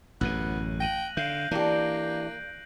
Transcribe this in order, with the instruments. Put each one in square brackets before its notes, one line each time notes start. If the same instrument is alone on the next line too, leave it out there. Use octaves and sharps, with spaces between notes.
[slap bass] A1 F#2 A2 [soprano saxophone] B3 [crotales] F#6 D#7
[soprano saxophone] G5 [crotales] A#6 D#7 F#7
[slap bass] D3 [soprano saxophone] F5 [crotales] G6 C7 D7
[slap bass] E3 [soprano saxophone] A#3 [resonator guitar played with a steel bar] D4 G4